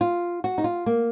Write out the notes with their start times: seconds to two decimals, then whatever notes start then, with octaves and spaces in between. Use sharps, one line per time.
0.01 F4
0.44 F#4
0.58 D#4
0.64 F4
0.86 A#3